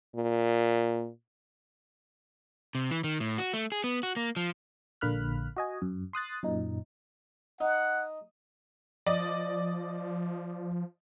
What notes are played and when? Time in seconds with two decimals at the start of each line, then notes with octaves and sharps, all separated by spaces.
0.16 A#2
2.75 C3
2.91 E3
3.04 D#3
3.20 A2
3.38 F#4
3.53 A3
3.72 G#4
3.84 B3
4.03 F#4
4.16 A#3
4.37 F3
5.01 A#1 D3 A#3 B5 F6 F#6
5.57 F#4 D#5 G#5
5.82 F#2
6.13 C6 D#6 F#6 A6
6.43 F#2 A#2 D#4
7.61 D#4 F#5
9.07 F3 D5 D#5